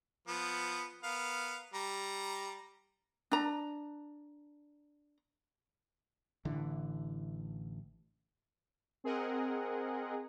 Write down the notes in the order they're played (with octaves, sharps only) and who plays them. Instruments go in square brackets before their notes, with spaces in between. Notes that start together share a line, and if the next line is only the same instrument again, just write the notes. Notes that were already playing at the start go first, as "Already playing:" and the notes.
[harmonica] F3 B3
B3 A#4 F5
G3 A#5
[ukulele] D4 A#5
[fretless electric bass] A1 D3 E3
[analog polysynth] C4 G#4 A#4 D#5 F#5